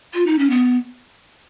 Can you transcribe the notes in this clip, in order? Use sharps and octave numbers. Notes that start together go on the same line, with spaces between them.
F4
D#4
C#4
B3